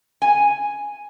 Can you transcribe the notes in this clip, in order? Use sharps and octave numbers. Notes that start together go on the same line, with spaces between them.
G#5